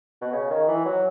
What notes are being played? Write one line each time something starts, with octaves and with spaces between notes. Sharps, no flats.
B2
C#3
D#3
E3
F#3